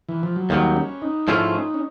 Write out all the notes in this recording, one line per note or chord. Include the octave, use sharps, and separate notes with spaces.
E3
F3
F#3
D#2 D#3 F#3 G3
C#4
D#4
G#2 F3 A3 C#4 E4 F4
D#4
C#4